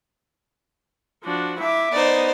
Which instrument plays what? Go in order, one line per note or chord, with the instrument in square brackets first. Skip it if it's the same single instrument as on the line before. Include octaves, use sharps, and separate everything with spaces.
[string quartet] F3 D4 F#4
E4 E5 D6
[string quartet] B3 D#4 [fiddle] C5 D5